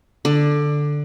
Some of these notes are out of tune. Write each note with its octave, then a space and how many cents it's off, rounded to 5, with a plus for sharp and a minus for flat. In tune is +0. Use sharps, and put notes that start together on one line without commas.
D3 +0 D5 +15